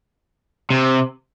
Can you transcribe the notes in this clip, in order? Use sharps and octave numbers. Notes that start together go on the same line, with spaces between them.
C3